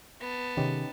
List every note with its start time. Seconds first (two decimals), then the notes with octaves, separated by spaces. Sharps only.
0.21 B3 A5
0.57 C3 D#3 C#4 D#4 G4